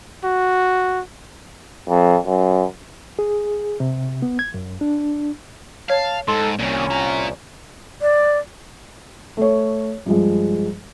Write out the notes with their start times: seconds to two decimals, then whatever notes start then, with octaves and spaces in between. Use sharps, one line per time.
0.24 F#4
1.89 F2
2.26 F#2
3.19 G#4
3.80 C3
4.22 B3
4.39 G#6
4.54 F#2
4.81 D4
5.90 C#5 F5 A5 G#6
6.28 G#2 A4 C6
6.59 C2 A#2 D#3 C#4
6.91 F4 A#5
8.02 D5
9.37 A3 C#5
10.06 G2 F3 G#3